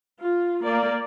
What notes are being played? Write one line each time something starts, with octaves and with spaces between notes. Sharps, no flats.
F4
A#3 D5